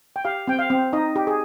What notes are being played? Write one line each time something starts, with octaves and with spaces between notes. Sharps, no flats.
G5
G4 F5
C4 G5
F5
C4
D#4 D#5
G4
G#4